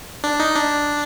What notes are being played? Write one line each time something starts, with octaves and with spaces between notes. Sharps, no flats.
D4
D#4
D4